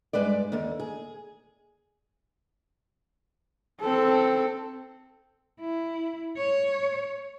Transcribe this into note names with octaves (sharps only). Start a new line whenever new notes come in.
G2 G#3 B4 D5
D#2 D3
G#4
C4 A4
E4
C#5